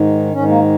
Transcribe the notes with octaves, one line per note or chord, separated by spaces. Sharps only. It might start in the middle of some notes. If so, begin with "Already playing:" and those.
Already playing: G#2 D#3
G#2 D#3 C#4
A#3